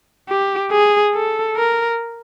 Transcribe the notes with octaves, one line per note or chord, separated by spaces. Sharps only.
G4
G#4
A4
A#4